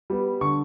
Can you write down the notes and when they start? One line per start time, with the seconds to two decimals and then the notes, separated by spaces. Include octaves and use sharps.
0.10 G3 B3
0.41 D3 C#6